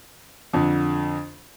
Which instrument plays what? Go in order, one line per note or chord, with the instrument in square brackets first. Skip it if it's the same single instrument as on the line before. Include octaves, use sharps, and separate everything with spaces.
[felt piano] F2 D3